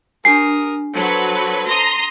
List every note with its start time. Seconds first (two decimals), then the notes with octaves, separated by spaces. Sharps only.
0.25 D4 G4 A#4 G#5 D#6 C7
0.95 F#3 A4 B4 C5
1.68 A#5 C6 D#6